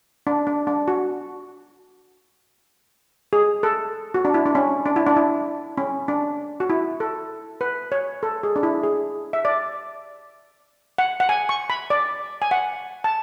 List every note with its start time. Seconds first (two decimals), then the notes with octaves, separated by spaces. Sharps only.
0.27 D4
0.47 D4
0.67 D4
0.88 F#4
3.33 G#4
3.63 A4
4.14 F#4
4.25 D4
4.34 E4
4.46 D4
4.55 C#4
4.86 D4
4.96 E4
5.07 D4
5.16 E4
5.78 C#4
6.08 D4
6.60 F#4
6.70 E4
7.00 A4
7.61 B4
7.92 C#5
8.23 A4
8.43 G#4
8.56 D4
8.63 E4
8.83 G#4
9.33 E5
9.45 D5
10.98 F#5
11.20 F#5
11.29 G#5
11.49 C#6
11.70 B5
11.90 D5
12.42 G#5
12.51 F#5
13.04 A5